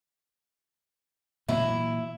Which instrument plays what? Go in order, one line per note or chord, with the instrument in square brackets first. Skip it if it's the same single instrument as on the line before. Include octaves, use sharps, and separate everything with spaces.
[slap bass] A#2 E3 F#3 [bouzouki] E4